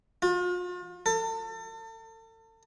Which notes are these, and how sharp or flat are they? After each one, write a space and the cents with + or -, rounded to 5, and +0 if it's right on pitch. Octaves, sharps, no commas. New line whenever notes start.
F4 +40
A4 +35